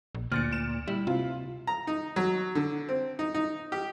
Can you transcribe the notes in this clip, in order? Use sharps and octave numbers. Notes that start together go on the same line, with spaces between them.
A#1
D2 A#2 F6 A6 C#7
D7 E7
G3 E4
C3 F4
A#5
D#4
F#3
D3
C4
D#4
D#4
G4